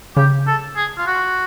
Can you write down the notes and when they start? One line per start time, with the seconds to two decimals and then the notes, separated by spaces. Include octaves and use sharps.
0.16 C#3 G4
0.47 A4
0.76 G#4
0.97 F4
1.07 F#4